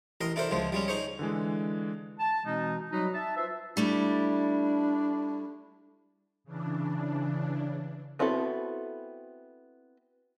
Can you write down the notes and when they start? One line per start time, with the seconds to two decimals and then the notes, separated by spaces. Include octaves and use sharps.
0.21 A1 A#4 D#5 C6
0.36 D4 E4 A4 A#4 C5
0.51 C#2 F3 G#3
0.72 G3 G#3 C#4
0.88 D#4 G#4 C5 C#5
1.19 D3 E3 G#3
2.20 A5
2.45 B2 E3 G#3 C4 D#4
2.92 F#3 G3 D#4 F#4 B4 D#5
3.13 E5 A5
3.36 F4 B4 C5 E5
3.77 G3 A3 D4 E4
6.44 C#3 E3 D4
8.19 B3 C4 E4 F#4 A4